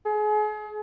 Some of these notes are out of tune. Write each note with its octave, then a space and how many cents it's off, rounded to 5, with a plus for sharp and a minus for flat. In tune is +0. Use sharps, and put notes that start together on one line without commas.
G#4 +35